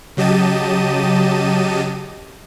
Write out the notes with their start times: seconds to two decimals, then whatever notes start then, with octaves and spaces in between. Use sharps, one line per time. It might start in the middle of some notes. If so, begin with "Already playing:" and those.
0.17 C#3 F#3 G4 D#5 A5 D#7